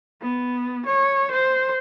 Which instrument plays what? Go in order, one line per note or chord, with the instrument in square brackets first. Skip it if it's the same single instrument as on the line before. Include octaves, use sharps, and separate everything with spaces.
[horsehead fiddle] B3
C#5
C5